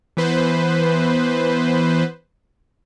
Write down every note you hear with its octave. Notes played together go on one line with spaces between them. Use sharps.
E3 B3 B4 C5